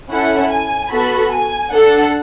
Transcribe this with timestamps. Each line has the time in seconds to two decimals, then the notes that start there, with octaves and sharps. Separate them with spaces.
0.10 C#4 E4 A4 F#5
0.51 G#5
0.91 B3 F#4 A4 B5
1.31 G#5
1.72 D4 A4 F#5